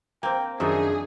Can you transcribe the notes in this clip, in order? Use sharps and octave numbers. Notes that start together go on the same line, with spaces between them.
A#3 C4 G5
F#2 D#3 F3 D4 D#4 G#4 E5